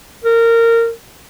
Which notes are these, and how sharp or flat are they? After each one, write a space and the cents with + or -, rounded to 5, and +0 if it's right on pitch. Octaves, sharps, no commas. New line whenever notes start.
A#4 -20